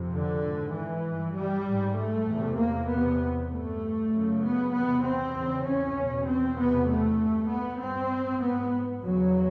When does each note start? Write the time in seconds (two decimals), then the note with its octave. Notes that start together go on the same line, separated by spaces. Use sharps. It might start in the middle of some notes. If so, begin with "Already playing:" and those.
Already playing: F2 C3
0.13 D3
0.44 G#2
0.74 E3
1.06 G2
1.36 G3
1.67 G#2
1.97 A3
2.27 E2 C3
2.59 A#3
2.89 E2 C3 B3
3.50 G2 A3
4.12 F#2 C#3
4.44 B3
4.73 E2 C3 B3
5.05 C4
5.36 E2 C#3
5.66 C#4
5.96 E2 B2
6.27 C4
6.57 E2 C3 B3
6.88 A3
7.19 G2
7.49 B3
7.81 G2 C4
8.42 G#2 B3
9.03 E2 C#3 F#3